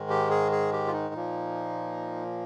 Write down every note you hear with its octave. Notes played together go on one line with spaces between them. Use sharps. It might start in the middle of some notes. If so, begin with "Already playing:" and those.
Already playing: G#2 D#3 G#3
G4
G#4
G#4
G4
F4
D#4
A#2 F3 A#3